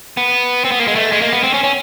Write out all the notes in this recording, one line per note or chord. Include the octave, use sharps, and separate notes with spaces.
B3
C4
B3
A#3
G#3
A3
G#3
A#3
B3
C4
C#4
C#4